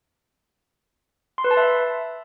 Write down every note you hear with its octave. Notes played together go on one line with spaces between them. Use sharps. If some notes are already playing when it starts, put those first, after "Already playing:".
C6
B4
A5
E5